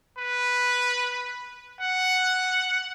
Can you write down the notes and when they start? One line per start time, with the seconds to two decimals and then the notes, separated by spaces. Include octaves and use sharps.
0.18 B4
1.81 F#5